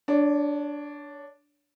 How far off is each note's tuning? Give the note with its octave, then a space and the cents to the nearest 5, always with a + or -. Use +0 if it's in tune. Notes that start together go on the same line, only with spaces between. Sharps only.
D4 -5 C#5 +25